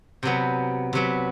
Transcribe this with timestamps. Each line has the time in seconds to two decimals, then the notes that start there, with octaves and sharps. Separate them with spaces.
0.23 C3 F#3 B3
0.93 C3 F#3 B3